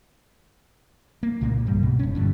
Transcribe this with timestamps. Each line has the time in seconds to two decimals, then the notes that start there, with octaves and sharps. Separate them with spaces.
1.23 A#3
1.41 C2 A#2 C#3 A#3
1.66 A1 G2 G3
1.83 B2
1.99 F1 C#4
2.15 G2 D3 G3